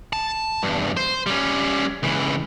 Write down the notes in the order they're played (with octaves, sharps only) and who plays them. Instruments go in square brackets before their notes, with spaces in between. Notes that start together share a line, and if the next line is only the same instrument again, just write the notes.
[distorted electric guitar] A5
E2 G2
C5
G3 C#4
C#2 E3